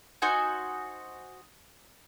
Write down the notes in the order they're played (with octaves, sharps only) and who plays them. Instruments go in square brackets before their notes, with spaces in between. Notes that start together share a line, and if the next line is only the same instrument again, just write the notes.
[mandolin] D#4 F#4 C5 G#5